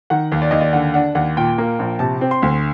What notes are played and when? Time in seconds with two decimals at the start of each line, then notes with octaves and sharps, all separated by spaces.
0.10 D#3 F#5
0.32 D#2
0.42 D5
0.51 D#2 D#5
0.61 D5
0.73 D3 F#5
0.94 D4 F#5
1.15 D#2 F#5
1.37 A#2 G5
1.58 A#3
1.79 A#1
1.99 C3 A5
2.21 C4
2.31 C6
2.42 D2